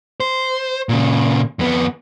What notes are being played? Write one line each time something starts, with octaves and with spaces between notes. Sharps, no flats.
C5
A#2 C#3
F2 B3